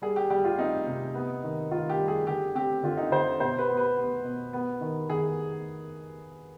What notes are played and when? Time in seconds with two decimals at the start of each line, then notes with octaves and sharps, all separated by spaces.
0.02 G3 G#4
0.16 G4
0.30 G3 G4
0.45 F4
0.58 C4 D#4
0.87 C3
1.14 B3
1.43 D#3
1.71 D#3 F4
1.89 G4
1.99 G3
2.08 G#4
2.27 D3 G4
2.55 C4 G4
2.83 D3 F4
2.97 D#4
3.11 D3 C5
3.40 B2 C5
3.59 B4
3.68 B3
3.77 B4
3.97 B3
4.24 B2
4.53 B3
4.81 D#3
5.09 D#3 G#4